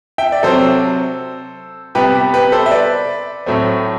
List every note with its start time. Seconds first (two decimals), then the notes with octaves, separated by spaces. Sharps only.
0.18 E5 G5
0.32 D5
0.43 C3 F#3 C4 A4 C5
1.95 C3 G3 B3 G4 B4
2.15 G4
2.34 G4 B4
2.52 A4 C5
2.66 E5
2.71 B4 D5
3.46 A2 F#3 A3 C4